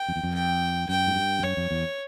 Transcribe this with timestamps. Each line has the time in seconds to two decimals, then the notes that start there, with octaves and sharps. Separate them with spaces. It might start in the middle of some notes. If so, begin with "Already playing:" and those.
Already playing: G5
0.08 F2
0.16 E2
0.23 F2
0.35 G5
0.89 F#2 G5
1.07 G#2
1.16 G2
1.39 F2
1.43 F#2 C#5
1.57 F2
1.71 E2